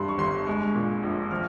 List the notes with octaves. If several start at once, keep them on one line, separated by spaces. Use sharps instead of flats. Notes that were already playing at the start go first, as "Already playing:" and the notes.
Already playing: G2 G3 C6
C#6
G1 C6
G#3 C#6
A#2
A#1
F3 F6